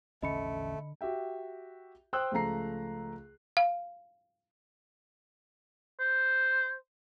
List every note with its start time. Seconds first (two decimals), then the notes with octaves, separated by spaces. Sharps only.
0.22 A#1 E2 D3 A3 C#4 D#5 B5 C#7
1.01 F#4 G4 E5 G5
2.13 C5 G5 C6 D#6 E6 F#6
2.32 C#2 C#3 F3 A3 A#5 C7
3.57 F5
6.00 C5